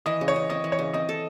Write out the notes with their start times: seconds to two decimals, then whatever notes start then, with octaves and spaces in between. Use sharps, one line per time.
0.06 E3 D#5
0.21 C#3
0.28 C#5
0.36 C#3
0.50 C4 D#5
0.64 E3
0.72 C#5
0.79 C#3
0.93 C4 D#5
1.09 A4